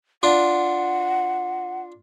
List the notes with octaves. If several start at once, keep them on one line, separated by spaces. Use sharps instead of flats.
D4 F4 F#5